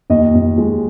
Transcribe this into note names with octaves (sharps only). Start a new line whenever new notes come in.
D#2 D#5
D#2
G#3